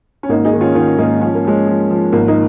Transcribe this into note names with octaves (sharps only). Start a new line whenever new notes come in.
C#4
G#1 A#3 D#4
D#4 G#4
D#3
C#4 F4
D#3 C#4 F4
G#2 A#3 D#4
F3 C#4
A#3
F3 G#3 C#4
F3
F3
G#1 A#3
A#3 D#4